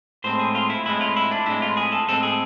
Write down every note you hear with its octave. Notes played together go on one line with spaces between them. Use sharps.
A2 G#3 C4 C5
G#4
F4
E4
A2 G#3 C4 E4
F4
E4
D4
A2 G#3 C4 E4
F4
G#4
A4
A2 G#3 C4 A4
G#4